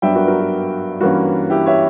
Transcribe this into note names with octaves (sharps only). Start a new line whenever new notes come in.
G2 F#3 B3 D4 E5 G5
F#4 A#4
F#4 A#4
F#4
G2 E3 A#3 C#4 F#4
E4 G4
C#5 E5